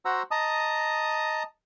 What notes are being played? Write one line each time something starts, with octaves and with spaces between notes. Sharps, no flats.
F#4 C5 F#5 A#5 E6
D#5 A5 A#5 D#6